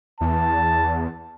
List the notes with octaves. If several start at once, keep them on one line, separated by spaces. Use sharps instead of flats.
E2 A5